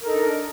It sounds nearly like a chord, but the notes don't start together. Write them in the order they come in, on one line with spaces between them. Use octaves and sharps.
A#4 A4 D#4 D4